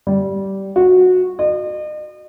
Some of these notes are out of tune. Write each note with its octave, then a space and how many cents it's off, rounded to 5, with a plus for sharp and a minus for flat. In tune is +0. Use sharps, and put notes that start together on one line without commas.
G3 -15
F#4 -15
D#5 -40